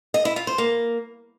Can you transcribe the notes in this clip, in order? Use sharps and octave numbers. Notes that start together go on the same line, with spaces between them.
D#5
E4
F4
C5
A#3